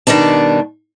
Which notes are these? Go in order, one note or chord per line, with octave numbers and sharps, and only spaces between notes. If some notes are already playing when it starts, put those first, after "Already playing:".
B2 D#3 G3 D4 A5